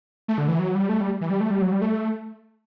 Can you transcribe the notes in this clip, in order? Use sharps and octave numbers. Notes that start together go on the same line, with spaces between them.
A3
D3
E3
F#3
G3
A3
G3
E3
G3
A3
G3
F#3
G3
A3